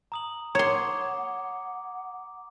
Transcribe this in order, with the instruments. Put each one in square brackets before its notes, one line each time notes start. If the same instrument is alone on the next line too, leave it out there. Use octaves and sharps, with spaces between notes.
[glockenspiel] A#5 D#6 F#7
[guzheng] C#5 C6 [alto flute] F#5 [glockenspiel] A#5 D6